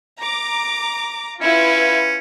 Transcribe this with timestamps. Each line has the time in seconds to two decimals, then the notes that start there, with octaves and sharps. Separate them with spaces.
0.18 A#5 D6
1.42 C#4 E4 F4 B4